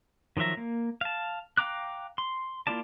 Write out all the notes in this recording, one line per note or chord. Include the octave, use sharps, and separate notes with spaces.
D#3 F3 F#3 E5 A#5
A#3
F5 A5
F5 G5 A#5 D6 F#6
C6
A#3 E4 F4 D5 A5